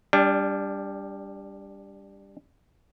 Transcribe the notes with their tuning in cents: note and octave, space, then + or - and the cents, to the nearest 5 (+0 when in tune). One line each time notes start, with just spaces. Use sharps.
G3 +15 D4 -20